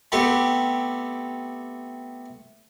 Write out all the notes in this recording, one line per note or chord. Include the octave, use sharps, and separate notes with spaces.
A3 B3 C4 G4